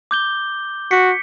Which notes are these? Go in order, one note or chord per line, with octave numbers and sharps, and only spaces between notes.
D6 G6 G7
F#4 B6 C#7